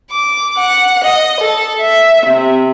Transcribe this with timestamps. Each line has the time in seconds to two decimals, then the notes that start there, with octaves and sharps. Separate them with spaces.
0.12 D6
0.58 F#5
1.05 D#5
1.41 A4
1.80 E5
2.27 C3